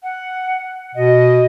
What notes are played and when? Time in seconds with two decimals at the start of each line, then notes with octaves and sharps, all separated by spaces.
0.03 F#5
0.95 B2 D#5